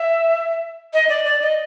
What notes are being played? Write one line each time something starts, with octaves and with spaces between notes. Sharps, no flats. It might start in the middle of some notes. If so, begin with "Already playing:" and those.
Already playing: E5
D#5
D5
D5
D#5